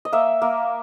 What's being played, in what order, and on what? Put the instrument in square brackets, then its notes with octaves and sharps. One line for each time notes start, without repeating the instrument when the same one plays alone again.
[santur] D#5
A#3 E5
A#3